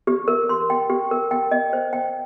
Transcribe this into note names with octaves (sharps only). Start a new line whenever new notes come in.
G4
A#4
C6
G5
G4
A#4
G5
D#5
C5
G5